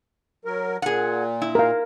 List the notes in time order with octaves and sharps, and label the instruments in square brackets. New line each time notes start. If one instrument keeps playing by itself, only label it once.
[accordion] F#3 A#4
[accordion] A#2 [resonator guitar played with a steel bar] G#4 F#5
[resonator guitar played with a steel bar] E4
[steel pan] A#4 F5